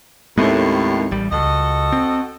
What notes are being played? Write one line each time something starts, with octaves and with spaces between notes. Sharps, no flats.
D#2 A2 G#3 B3 C4
A1 G3
C#2 F#4 A4 D#5
C4